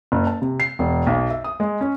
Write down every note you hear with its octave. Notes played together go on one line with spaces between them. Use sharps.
F#1
A5
C3
C7
E1
B1
E5
D#6
G#3
C#4